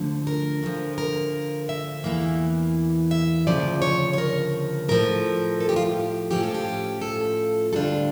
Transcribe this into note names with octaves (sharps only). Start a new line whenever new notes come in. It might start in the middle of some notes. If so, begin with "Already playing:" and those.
Already playing: D2 D3 F3 A3
A#4
D2 D3 F3
A#4
E5
E2 E3 A#3
E5
D2 C#3 F3 D5
C#5
C#5
A#4
A2 F3 A3 A#4
A4
G4
F4
G4
A2 F3 C#4 F4 G4
A4
G4
A4
D2 D3 G3 D4 F4 A4